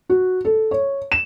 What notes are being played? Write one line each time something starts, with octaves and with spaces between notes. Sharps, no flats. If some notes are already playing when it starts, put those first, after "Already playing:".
F#4
A4
C#5
E7